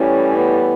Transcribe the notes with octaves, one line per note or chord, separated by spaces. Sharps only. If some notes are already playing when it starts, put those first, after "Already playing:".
Already playing: A2 E3 G3 C#4
B3